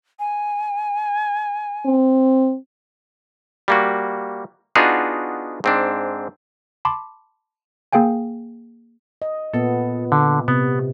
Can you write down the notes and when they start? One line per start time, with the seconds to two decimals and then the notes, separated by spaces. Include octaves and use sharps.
0.19 G#5
1.86 C4
3.68 G3 A#3 F#4
4.75 B3 D4 D#4 F4 F#4 G#4
5.64 G#2 C4 D4
6.85 A5 B5 C6 D6
7.93 A#3 G#4 F5 G5 G#5
9.22 D#5
9.54 A#2 B3 A4
10.12 D3
10.48 C3 B3